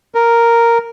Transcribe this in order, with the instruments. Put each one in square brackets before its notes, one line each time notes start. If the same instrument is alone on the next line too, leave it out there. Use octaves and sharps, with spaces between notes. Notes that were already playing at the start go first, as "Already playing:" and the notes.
[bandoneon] A#4